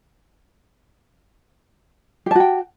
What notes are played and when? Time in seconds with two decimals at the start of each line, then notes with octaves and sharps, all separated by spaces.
2.26 G4
2.31 A5
2.35 F#4
2.40 G5